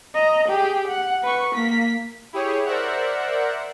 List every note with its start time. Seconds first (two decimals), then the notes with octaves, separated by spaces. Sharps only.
0.15 D#5 A#5
0.49 G4 G#4
0.88 F#5
1.24 B4 C#6
1.55 A#3 B6
2.33 E4 G4 G#4 C#5
2.66 A#4 C5 D5 E5 F#5